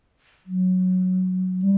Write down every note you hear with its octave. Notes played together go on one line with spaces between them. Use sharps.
F#3
G3